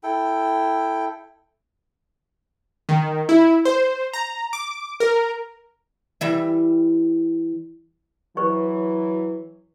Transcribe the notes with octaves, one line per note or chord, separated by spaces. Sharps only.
E4 A4 G5
D#3
E4
C5
A#5
D6
A#4
E3 G3 E5
E3 F#3 B4 C5 C#6